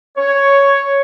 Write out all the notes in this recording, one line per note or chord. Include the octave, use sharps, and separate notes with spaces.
C#5